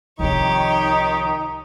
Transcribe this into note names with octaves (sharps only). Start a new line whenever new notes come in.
C2 D#3 F3 D#4 G4 C#5